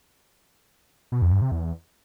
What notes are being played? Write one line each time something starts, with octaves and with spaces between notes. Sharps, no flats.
B2
F2
G2
C3
E2